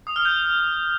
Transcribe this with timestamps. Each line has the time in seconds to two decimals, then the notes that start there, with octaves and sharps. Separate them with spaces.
0.07 D#6
0.16 F6
0.25 G6